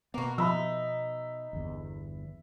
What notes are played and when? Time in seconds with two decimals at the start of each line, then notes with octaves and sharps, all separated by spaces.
0.14 B2 A#3 B3 F#4
0.38 F3 D#4 E5 B5 E6
1.53 G1 E2